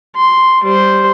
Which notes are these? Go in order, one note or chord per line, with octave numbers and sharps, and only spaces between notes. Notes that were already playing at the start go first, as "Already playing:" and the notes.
C6
G3 C5